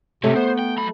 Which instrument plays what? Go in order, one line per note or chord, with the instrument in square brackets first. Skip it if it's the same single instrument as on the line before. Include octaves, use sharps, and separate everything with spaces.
[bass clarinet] C3 [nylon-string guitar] A3 [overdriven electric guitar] C4 C#5
[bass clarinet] B3 [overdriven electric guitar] C5
[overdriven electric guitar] G5
F#3 B5